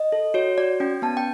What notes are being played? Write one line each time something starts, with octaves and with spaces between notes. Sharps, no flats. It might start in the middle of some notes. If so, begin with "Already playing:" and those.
Already playing: D#5
A4
F#4 C#5
F#4 D5
C#4 G5
B3 A5
G5